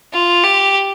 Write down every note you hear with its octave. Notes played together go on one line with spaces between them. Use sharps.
F4
G4